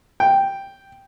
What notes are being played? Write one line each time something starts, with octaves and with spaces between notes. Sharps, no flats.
G5